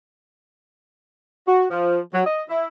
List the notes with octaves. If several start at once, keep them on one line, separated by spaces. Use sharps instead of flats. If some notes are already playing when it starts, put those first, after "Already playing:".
F#4
F3
F#3
D#5
E4